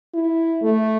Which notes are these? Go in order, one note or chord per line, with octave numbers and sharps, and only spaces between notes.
E4
A3